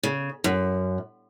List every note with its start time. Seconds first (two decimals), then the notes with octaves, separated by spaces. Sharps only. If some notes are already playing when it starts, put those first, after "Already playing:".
0.03 C#3
0.44 F#2